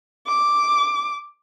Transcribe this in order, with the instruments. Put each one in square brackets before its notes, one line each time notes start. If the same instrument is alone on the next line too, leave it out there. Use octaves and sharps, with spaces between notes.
[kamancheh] D6